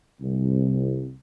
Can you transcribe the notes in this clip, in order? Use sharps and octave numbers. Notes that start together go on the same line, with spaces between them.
C2